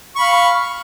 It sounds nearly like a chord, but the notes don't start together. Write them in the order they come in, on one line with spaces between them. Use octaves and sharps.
C#6 B5 F5